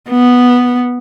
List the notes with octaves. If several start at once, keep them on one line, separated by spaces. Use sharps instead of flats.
B3